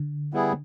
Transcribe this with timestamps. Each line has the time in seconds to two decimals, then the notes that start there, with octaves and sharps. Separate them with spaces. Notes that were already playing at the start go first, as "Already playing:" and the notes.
Already playing: D3
0.34 G3 B3 E4 G#4